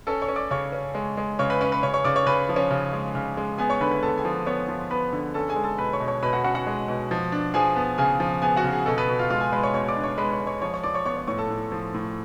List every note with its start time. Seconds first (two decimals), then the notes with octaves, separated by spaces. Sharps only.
0.07 C#4 A4 A5
0.22 C#5 C#6
0.28 C#4
0.36 D5 D6
0.51 C#3 C#5 C#6
0.72 C#4
0.95 G#3
1.17 G#3
1.39 C#3 C#5 C#6
1.50 B4 B5
1.61 C#4 B4 B5
1.72 B4 B5
1.83 C#3 C#5 C#6
1.94 C#5 C#6
2.04 C#3 D5 D6
2.16 C#5 C#6
2.27 C#3 B4 B5
2.49 F3
2.56 C#4 C#5
2.71 C#3
2.93 G#3
3.15 C#3
3.37 G#3
3.58 B3 G#4 G#5
3.69 C#5 C#6
3.81 D3 B4 B5
3.91 B4 B5
4.02 B3 A4 A5
4.17 G#4 G#5
4.25 F3
4.46 B3 C#5 C#6
4.68 F3
4.90 B3 B4 B5
5.13 D3
5.34 C#4 A4 A5
5.49 G#4 G#5
5.56 G#3
5.63 A4 A5
5.78 B2 B4 B5
5.93 C#5 C#6
6.00 B2
6.07 C#5 C#6
6.22 B2 B4 B5
6.33 F#4 F#5
6.44 C#4 F#4 F#5
6.55 F#4 F#5
6.67 G#3
6.88 B2
7.11 F3
7.32 D4
7.54 F3 G#4 G#5
7.76 B3
7.98 C#3 G#4 G#5
8.20 F3
8.42 B3 G#4 G#5
8.56 F#4 F#5
8.64 C#3
8.72 G#4
8.86 B2 A4
8.97 B3 B4
9.09 B2
9.19 F4 F5
9.30 G#3 F4 F5
9.41 G#4 G#5
9.52 G#3 B4 B5
9.63 C#5 C#6
9.74 B2 C#5 C#6
9.88 D5 D6
9.96 D4
10.03 C#5 C#6
10.18 G#3 B4 B5
10.32 C#5 C#6
10.40 G#3
10.47 C#5 C#6
10.62 F3 C#5 C#6
10.74 C#5 C#6
10.83 F3 D5 D6
10.94 C#5 C#6
11.05 B3 C#5 C#6
11.17 C#5 C#6
11.28 A2 C#5 C#6
11.38 A4 A5
11.50 A2
11.72 F3
11.94 A2